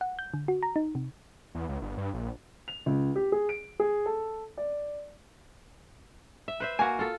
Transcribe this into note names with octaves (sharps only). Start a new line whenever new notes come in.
F#5
G6
D3
F#4
A#5
D#4
C3
E2
C#2
G1
G2
A#1
F7
C#2
G4
G#4
D7
G#4
A4
D5
E5
B4 C5 E5
A#3 F#4 G#5
F4 A4